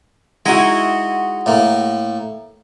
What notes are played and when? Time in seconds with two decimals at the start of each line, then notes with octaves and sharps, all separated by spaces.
0.46 G#3 D#4 E4 F#4 F#5 A#5
1.46 A2 A#3